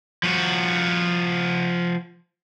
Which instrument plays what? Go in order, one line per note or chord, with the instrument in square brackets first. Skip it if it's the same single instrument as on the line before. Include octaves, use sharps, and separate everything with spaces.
[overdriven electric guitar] F3 F#4